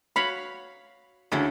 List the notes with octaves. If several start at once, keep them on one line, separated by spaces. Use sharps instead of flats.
F#4 C#5 F5 B5
D2 C#3 E4 A4